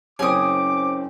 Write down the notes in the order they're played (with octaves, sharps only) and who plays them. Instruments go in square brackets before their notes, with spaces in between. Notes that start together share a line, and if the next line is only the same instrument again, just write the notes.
[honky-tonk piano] F#1 C4 D7 [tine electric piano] C#4 G5 [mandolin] G#5 D#6 [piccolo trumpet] D6